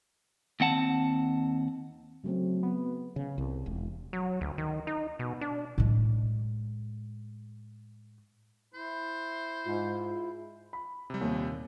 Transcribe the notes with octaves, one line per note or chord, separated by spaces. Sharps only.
D#2 C4 F#5 A5
C#3 F#3 A3 C4
B3
C#3
C2
E1
F#3
D2
D#3
D#4
B2
D4
A2 G#3
E4 C5
G#2 F4
B5
C3 G3
D#2 A#2